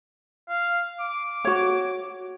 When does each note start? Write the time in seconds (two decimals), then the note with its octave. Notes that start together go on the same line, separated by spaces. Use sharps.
0.49 F5
1.00 D6
1.45 F#4 C#5